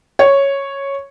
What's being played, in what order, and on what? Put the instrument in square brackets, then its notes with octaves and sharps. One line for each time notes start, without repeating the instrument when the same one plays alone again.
[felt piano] C#5